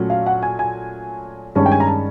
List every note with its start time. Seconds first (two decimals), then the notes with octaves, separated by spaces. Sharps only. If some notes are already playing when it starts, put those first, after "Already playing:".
Already playing: A#2 F#3 A3 C#4
0.10 F5
0.26 F#5
0.43 G#5
0.59 G#5
1.55 G2 D#3 G#3 C#4 A5
1.66 G5
1.72 G#5
1.80 A#5
1.87 A5